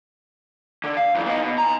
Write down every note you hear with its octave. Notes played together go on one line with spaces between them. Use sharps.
D3
F5
F#2 E3
B3 D#4
B2
G#5 A#5